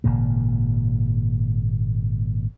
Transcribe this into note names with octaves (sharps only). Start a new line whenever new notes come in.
G#1 A#2 C#3 A#3